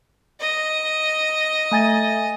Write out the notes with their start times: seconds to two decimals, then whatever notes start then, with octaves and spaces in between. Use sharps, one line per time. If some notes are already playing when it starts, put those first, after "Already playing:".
0.41 D#5
1.71 A3 G#5 A6